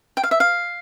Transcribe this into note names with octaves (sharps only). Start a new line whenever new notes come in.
G5
F5
E5
F5